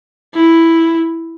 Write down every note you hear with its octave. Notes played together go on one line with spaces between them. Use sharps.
E4